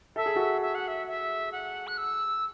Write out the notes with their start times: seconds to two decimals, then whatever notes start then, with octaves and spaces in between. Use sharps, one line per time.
0.16 A4 E5
0.26 G#4
0.35 F#4 A4
0.62 E5
0.75 F#5
0.88 E5
1.08 E5
1.52 F#5
1.87 F#6
1.98 E6